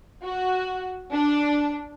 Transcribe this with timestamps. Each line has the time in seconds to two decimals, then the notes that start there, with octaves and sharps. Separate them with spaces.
0.23 F#4
1.13 D4